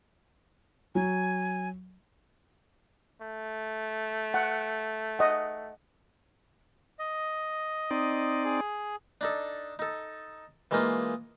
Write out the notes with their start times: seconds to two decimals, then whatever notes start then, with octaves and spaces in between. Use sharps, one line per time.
0.95 F#3 G#5
3.22 A3
4.34 F#5
5.19 D#5 F#5
6.99 D#5
7.91 C4 D#4 D5
8.45 G#4
9.21 D4 D#4 A4
9.79 D#4 A4
10.71 E3 G#3 A#3 D#4 F4